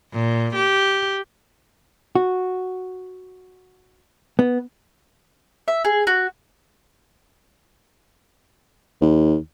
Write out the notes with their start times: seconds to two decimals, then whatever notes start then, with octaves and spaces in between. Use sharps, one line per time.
0.13 A#2
0.56 G4
2.15 F#4
4.39 B3
5.68 E5
5.85 G#4
6.07 F#4
9.02 D#2